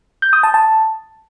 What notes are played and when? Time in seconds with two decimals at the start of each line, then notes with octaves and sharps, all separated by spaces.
0.22 G6
0.33 D#6
0.43 A5
0.54 A5